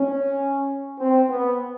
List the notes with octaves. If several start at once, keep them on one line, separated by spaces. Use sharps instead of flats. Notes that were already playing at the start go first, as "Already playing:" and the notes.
Already playing: C#4
C4
B3